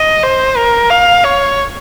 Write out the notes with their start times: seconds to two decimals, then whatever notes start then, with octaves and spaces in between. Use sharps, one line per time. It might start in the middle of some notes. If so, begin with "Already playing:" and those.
Already playing: D#5
0.23 C5
0.57 A#4
0.90 F5
1.24 C#5